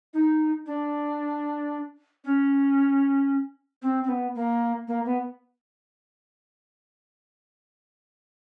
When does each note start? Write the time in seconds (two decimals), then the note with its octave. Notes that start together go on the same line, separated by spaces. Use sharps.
0.14 D#4
0.66 D4
2.24 C#4
3.82 C4
4.03 C4
4.09 B3
4.35 A#3
4.88 A#3
5.05 B3